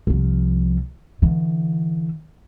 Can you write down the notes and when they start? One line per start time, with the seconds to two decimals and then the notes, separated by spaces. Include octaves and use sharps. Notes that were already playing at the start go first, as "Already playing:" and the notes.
0.07 C2 F3
1.22 D3 E3